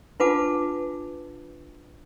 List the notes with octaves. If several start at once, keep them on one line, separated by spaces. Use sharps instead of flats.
D4 F4 B4 F#5 A5 D6